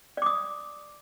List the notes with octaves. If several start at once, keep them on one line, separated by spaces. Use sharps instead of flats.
D5 D6 D#6